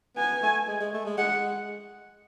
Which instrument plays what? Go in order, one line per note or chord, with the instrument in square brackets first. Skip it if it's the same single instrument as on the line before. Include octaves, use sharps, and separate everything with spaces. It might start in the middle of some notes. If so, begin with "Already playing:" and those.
[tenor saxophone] B3 [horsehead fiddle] G#5
[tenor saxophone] A3
G#3
G#3
A3
G#3
[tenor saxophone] G#3 [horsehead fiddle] F#5